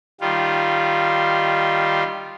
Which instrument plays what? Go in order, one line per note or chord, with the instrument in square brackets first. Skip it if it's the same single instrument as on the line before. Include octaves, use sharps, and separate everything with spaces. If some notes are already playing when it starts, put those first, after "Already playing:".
[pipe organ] D#3 G3 F4